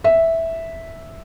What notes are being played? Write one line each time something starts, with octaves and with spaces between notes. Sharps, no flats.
E5